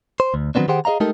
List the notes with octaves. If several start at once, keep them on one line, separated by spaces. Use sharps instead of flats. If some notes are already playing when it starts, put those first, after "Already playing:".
C5
D2
D#3 F#3 G#3 B3 C4 D4
D#3 G4 G#4 C5 F#5 G5
G#4 A4 D#5 F5 A#5
G#3 A3 D#4 G4 A4 A#4